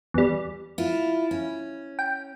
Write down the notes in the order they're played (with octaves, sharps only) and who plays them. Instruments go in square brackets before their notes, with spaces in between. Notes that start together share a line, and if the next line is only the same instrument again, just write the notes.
[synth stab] E2 G3
[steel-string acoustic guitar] E4 F4
C#4
[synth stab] G5